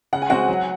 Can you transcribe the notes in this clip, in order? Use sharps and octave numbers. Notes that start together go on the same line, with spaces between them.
C#3 F#5
G#5
G#3 C4 F#4 F#5
F#3